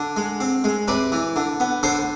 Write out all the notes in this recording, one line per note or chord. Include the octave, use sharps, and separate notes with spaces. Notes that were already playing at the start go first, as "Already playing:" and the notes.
Already playing: D3
G#3
C4
G#3
C3 B4 D5
E3
D3
B3
D3 A4 C5